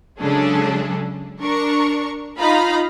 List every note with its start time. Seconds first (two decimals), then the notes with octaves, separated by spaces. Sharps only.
0.20 C#3 F#3 G#3 D4 G#4 A4
1.41 D4 A#4 C#6
2.40 D#4 F4 F5 A#5 B5